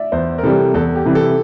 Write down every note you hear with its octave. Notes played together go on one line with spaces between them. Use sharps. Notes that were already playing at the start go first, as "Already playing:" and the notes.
Already playing: D5 E5
E2 C5
A#4
C3 E3 G3 A4
E2 A4
G4
C3 E3 G3
A4